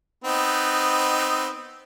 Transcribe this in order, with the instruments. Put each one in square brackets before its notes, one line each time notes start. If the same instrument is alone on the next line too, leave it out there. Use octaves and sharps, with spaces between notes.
[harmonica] B3 C4 D#4